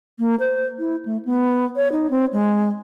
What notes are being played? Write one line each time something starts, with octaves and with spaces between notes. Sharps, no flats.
A#3
C5
E4
A3
B3
C#5
D#4
C4
G#3